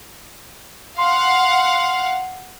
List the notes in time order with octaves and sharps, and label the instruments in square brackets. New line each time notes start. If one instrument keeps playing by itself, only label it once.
[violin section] F5 F#5 [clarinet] C6